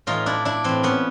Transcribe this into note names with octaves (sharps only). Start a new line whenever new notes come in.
A2 E3 D#4 F4
D4 E4
D4 E4
A2 E3 C4
B3 C#4